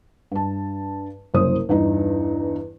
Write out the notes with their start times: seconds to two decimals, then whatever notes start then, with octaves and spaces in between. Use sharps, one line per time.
0.31 G2 A5
1.34 F#1 C2 F#2 C5 D#6
1.69 E2 G2 D#4